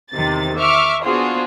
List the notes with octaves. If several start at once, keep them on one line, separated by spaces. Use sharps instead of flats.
E2 C3 D#3 A6
E5 C#6 D6 F6
B3 D4 F4 F#4 G#4 C5